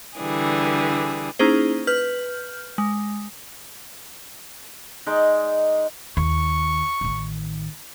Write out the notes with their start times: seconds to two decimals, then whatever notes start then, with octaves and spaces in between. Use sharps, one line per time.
0.18 D3 E3 G3 G#4
1.39 A#3 C#4 D#4 E4 G#4 C5
1.87 B4 F6 G6
2.78 G#3
5.06 G#3 D#4 D5
6.17 D#2 C#6
7.01 A1 D#3